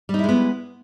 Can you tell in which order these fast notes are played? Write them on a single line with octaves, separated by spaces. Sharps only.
G3 D#4 E4 G#3 B3